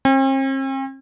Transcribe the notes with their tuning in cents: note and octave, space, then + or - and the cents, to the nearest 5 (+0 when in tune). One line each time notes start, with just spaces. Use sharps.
C4 +45